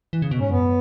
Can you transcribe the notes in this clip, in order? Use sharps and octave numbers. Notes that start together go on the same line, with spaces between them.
E3
C#3
B2
G#2 C#4
F#2 B3